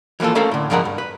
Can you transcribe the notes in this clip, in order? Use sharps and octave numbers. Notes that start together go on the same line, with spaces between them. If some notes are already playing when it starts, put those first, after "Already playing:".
E3 F3 A#3 F4 A4
A3 C#4 A4 A#4 F5
A2 D3
C#2 G2 F3 G#3 A#4 F#5
G2
B4